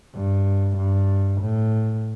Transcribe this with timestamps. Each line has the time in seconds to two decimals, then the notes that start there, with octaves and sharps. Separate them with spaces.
0.15 G2
0.77 G2
1.41 A2